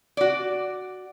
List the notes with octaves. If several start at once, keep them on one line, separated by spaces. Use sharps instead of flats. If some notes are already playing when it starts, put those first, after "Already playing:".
F#4 D5